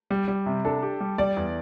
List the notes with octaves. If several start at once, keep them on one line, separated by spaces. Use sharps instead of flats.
G3
G3
C3
D4 A4
G4
G3
G3 D5
E2